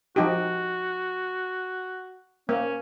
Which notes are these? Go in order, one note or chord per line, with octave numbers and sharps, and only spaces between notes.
F3 D#4 F#4 G4
A#3 C#4